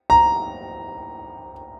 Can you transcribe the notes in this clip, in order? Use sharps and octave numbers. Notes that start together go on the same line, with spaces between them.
A#5